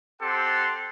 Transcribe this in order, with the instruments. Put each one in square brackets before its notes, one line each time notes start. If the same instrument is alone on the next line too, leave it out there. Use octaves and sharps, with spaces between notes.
[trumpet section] C4 G4 A4 F#5 C6